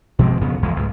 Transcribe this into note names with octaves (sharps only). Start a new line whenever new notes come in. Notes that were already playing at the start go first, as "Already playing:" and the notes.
B2 F3 G#3 C4
F2 C#3 B3
B1 F2 E3 G#3
C#2 G#2